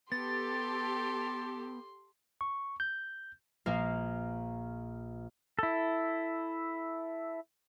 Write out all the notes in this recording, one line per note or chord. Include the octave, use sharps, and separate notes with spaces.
B3 G4 A4 C6 A6
C#6
G6
A#1 A#3 A#4 F5
E4 A4